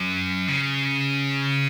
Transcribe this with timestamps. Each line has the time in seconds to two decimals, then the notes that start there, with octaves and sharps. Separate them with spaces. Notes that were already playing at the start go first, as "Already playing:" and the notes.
Already playing: F#2
0.48 C#3